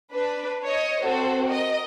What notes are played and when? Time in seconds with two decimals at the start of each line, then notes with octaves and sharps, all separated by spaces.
0.13 D4 B4
0.64 C#5 D#5
1.02 C4 F#4 A4 C5
1.46 A#4 D#5